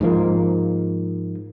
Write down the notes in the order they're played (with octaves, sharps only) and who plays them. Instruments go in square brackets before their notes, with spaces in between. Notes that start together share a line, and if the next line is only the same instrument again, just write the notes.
[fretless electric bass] G#2 F3 A#3